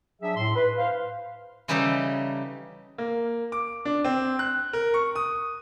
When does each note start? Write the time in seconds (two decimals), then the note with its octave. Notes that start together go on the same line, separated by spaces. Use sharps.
0.22 F#3 D4 G#4 E5
0.37 A2 C6
0.56 B4
0.78 C5 F5
1.68 C#3 E3 G3 D#4 G4 A4
2.98 A#3
3.52 D6
3.85 D4
4.04 C4
4.39 F#6
4.73 A#4
4.94 C#6
5.15 D#6